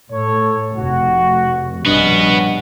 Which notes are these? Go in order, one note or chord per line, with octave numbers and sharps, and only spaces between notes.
A2 A4 C#5
F1 F#4
A#1 G2 B3 C#4 F#4 D#5